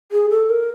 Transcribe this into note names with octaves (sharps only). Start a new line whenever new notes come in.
G#4
A4
A#4